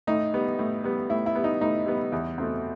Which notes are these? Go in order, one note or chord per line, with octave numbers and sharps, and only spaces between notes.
A2 D#4
G3 B3
A2
G3 B3
A2 E4
E4
G3 B3
D#4
A2 D#4
G3 B3
E2
B2 A3 C4